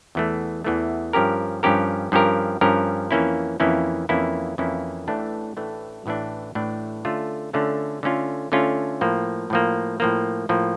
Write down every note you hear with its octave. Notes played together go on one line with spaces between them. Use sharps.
E2 E3 A3
E2 E3 A3
G2 F3 C#4 G4 A#4
G2 F3 C#4 G4 A#4
G2 F3 C#4 G4 A#4
G2 F3 C#4 G4 A#4
F2 E3 A#3 C#4 E4
F2 E3 A#3 C#4 E4
F2 E3 A#3 C#4 E4
F2 E3 A#3 C#4 E4
A1 A2 E3 A3 D4
A1 A2 E3 A3 D4
A1 A2 E3 A3 D4
A1 A2 E3 A3 D4
D3 A3 C#4 F4
D3 A3 C#4 F4
D3 A3 C#4 F4
D3 A3 C#4 F4
A2 F3 A#3
A2 F3 A#3
A2 F3 A#3
A2 F3 A#3